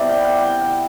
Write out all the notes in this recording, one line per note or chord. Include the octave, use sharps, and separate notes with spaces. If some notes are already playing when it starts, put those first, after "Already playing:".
Already playing: C3 G3 B3 E4 D5
G5
F#5
G5
F#5